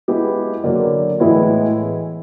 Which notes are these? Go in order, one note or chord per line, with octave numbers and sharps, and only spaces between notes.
G#3 B3 E4 G4
D3 F#3 A#3 D4
A2 E3 G#3 B3 E4